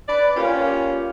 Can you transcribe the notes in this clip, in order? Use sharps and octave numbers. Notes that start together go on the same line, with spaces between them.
B4 D5
A#3 C#4 F4 G4